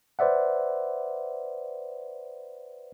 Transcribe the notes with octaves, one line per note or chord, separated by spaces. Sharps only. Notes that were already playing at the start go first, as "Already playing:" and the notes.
B4 C5 D5 E5 F#5